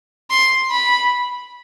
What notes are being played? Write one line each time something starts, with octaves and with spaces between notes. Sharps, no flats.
C6
B5